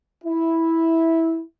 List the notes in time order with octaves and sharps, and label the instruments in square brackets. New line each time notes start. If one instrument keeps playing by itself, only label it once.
[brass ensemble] E4